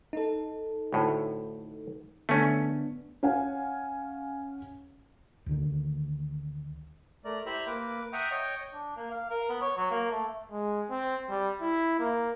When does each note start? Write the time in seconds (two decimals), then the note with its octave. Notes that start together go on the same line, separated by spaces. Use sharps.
0.13 D#4 A4
0.93 D2 A2
2.29 D3 A3 B3 C#4 D4
3.23 C#4 F5 F#5 G#5
5.46 D2 D3 D#3
7.24 A3 A#4 D5
7.46 E4 G4 C5 E5 A#5 B5
7.67 A#3 B4 D6
8.13 E5 F#5 G5 A#5 C#6 D#6
8.31 C#5 D#5 G5 C#6
8.73 D4
8.96 A#3
9.11 F5
9.30 A#4
9.49 B3
9.62 C#5
9.77 F#3
9.91 A#3
10.11 A3
10.52 G#3
10.91 C4
11.30 G3
11.62 E4
12.00 A#3